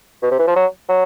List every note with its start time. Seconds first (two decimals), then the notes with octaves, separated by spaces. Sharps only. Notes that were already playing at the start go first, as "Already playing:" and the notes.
0.22 B2
0.31 C3
0.39 E3
0.47 F3
0.56 F#3
0.89 F#3